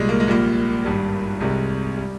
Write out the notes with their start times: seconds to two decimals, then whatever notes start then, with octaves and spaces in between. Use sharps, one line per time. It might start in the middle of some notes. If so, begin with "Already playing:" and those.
Already playing: C2 A#2 G3 G#3
0.09 A#3
0.20 G#3
0.27 A#1 A#2 G3 A#3
0.84 G#1 G2 G3
1.41 C2 C3 G3 G#3
1.97 G3